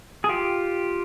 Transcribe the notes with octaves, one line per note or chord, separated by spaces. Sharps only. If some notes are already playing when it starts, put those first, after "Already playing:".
G#4
F4 G4